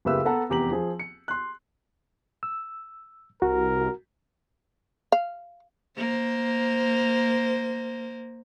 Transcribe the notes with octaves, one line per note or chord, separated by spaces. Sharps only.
F#1 C#2 G4 B4 E5 E6
B3 A4 B4 F#5 A5 A#5
F1 E2 G4 A#5 F#7
F3 G#4
C#7
C6 F#6
E6
C2 F#4 A#4
F5
A#3 C5